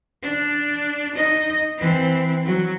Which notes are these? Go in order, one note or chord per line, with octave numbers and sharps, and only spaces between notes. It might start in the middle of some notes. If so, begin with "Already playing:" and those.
D4
D#4 D#5
E3 C4
F#3